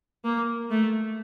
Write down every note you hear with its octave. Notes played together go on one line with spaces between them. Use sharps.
A#3
A3